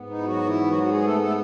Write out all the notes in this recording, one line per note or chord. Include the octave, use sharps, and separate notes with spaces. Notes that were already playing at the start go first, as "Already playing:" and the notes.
Already playing: G#2 B3
D#4
E4
F#3 F#4
E3 E4
F#3 F#4
F#4
G#3 G#4
A3 A4
A3 A4